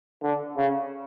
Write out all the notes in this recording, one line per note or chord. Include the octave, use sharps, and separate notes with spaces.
D3
C#3